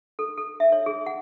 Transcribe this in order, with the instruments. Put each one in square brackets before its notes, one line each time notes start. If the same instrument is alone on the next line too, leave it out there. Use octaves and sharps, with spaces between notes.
[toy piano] A4
A4
E5
C#5
G#4
F#5